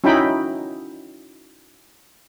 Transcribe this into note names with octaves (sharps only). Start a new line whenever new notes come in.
C#4 D#4 E4 F#4 G5 B5